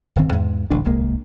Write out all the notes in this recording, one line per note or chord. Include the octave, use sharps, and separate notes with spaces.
D1 G1 D#3 C4
E2 G#2
D#1 A1 D3 D4
D1 C2 G#3 A#3